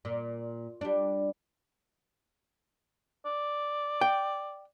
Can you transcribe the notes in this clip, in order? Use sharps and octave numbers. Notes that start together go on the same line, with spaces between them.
A#2
G3 D4
D5
G5